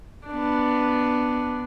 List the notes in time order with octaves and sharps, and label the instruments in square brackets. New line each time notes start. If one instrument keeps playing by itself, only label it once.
[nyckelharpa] B3 D4